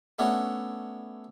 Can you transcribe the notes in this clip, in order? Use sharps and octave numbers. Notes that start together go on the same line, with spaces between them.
A3 B3 C#4 D4 E4 F#4